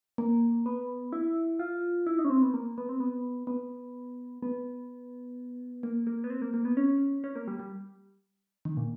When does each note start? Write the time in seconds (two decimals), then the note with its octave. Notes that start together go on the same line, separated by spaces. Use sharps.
0.18 A#3
0.66 B3
1.13 E4
1.59 F4
2.07 E4
2.19 D#4
2.25 C#4
2.30 C4
2.42 B3
2.54 A#3
2.78 B3
2.89 C4
3.00 B3
3.47 B3
4.43 B3
5.83 A#3
6.07 A#3
6.24 B3
6.30 C4
6.42 A#3
6.54 A#3
6.65 B3
6.77 C#4
7.24 C#4
7.36 A#3
7.48 G3
7.60 G3
8.65 D#3
8.77 A#2